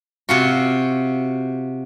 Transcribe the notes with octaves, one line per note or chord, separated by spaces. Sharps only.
C3 F4 F#4